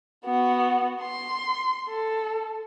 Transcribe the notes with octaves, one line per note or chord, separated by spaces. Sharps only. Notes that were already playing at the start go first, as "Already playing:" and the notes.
B3 F#4
C6
A4